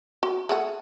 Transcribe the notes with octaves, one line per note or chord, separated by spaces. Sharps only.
F#4
A3 G#4 F#5